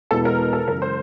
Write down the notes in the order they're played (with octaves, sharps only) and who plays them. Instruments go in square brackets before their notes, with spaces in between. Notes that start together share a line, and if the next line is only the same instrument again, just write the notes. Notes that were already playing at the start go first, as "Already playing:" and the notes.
[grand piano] E2 B2 G#3 B3 E4 [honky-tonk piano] A4
[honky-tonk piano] A#4
A4
[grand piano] F#2 C#3 E3 G#3 [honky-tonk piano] A#4
[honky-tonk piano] C5